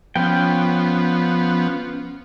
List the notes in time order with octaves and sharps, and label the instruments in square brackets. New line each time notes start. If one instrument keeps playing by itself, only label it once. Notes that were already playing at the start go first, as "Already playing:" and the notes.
[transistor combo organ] F3 B3 [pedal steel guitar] C#4 G5